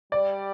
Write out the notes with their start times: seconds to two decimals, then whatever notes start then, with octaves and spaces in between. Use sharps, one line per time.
0.12 G3 D5